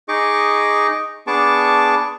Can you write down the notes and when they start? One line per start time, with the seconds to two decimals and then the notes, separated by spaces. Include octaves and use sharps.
0.09 D#4 G#4 D#5 C#6 D6
1.27 B3 D4 G#4 A5 C#6 D6